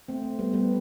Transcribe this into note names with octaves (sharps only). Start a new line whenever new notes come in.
A3 C4
A3
G3 B3
G3 B3